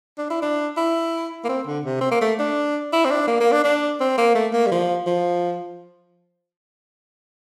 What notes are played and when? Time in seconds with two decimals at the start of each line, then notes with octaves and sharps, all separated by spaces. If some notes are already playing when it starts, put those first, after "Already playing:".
0.18 D4
0.30 E4
0.42 D4
0.77 E4
1.44 A#3
1.49 C4
1.67 D3
1.85 C3
2.01 C4
2.11 A#3
2.21 A3
2.39 D4
2.93 E4
3.05 C4
3.11 D4
3.28 A#3
3.40 A#3
3.52 D4
3.64 D4
4.00 C4
4.18 A#3
4.35 A3
4.53 A#3
4.67 G3
4.71 F3
5.07 F3